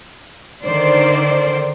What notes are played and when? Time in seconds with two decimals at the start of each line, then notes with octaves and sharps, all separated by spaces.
0.65 D3 D#3 C5 D5